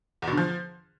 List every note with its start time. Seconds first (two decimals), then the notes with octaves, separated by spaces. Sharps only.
0.22 E2
0.27 B2
0.32 D3
0.37 F3